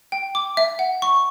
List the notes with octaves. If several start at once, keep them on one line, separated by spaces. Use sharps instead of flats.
G5
D6
E5
F#5
C#6